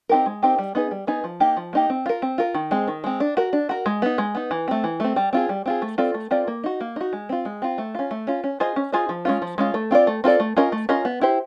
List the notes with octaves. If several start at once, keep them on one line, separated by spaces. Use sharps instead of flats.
C4 D#4 G4 A#4
G#3
C4 D#4 G4 A#4
G3
B3 D#4 G#4 B4
G3
B3 D#4 G#4 B4
F3
A#3 D#4 G4
F3
A#3 D#4 G4
C4
F4 A#4
C4
F4 A#4
D#3
G#3 C4
D#3
G#3 C4
D4
F#4 A#4
D4
F#4 A#4
G#3
B3 D#4
G#3
B3 D#4
E3
A3 C4
E3
A3 C4
G3
C4 F4 G#4
G3
C4 F4 G#4
A3
C4 F4 A4 D5
A3
C4 F4 A4 D5
A#3
D#4 F#4
A#3
D#4 F#4
G#3
C4 F4
G#3
C4 F4
A3
C#4 F4
A3
C#4 F4
C#4
F4 G#4 C5 D#5
C#4
F4 G#4 C5 D#5
F3
G#3 C#4 F4
F3
G#3 C#4 F4
A3
C4 F4 A4 D5
A3
C4 F4 A4 D5
A3
C#4 F4 A#4 D#5
A3
C#4 F4 A#4 D#5
B3
E4 G4 C5